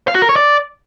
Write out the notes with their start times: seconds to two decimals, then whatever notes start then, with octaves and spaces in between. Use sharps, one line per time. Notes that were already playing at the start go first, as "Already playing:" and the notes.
0.08 F5
0.15 F#4
0.22 A#4
0.29 C#5
0.36 D5